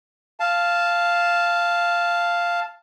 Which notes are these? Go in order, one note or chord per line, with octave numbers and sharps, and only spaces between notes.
F5 A5